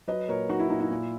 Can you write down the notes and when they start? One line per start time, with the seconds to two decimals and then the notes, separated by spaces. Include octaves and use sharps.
0.07 F#3 B4 D#5
0.28 A#2 A#4 C#5
0.49 F#3 D#4 F#4
0.60 E4
0.70 A#2 D#4
0.80 E4
0.91 A#2